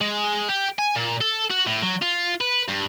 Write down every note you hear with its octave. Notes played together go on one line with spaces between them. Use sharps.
G#3
G4
G#5
A#2
A4
F#4
A2
F#3
F4
B4
G2